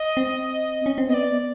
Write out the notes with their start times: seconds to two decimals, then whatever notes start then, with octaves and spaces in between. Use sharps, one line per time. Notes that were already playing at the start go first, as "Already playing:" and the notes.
Already playing: D#5
0.17 C4
0.86 C#4
0.98 C4
1.09 B3 D5 D#5